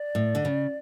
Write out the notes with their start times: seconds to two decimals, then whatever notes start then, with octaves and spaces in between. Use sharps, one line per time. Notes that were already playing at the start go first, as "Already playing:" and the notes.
Already playing: D5
0.15 A2
0.35 D3
0.45 C#3